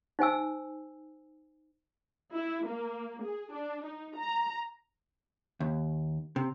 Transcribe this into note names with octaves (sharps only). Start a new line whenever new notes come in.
D#4 C5 G#5 E6
E4
A#3
G#4
D4
D#4
A#5
D#2
C3